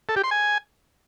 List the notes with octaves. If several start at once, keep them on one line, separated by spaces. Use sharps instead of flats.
A4
G4
C6
G#5